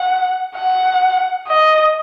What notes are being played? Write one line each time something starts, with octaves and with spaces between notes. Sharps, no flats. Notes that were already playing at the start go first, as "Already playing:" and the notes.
Already playing: F#5
F#5
D#5